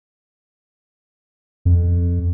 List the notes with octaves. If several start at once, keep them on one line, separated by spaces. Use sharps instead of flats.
F2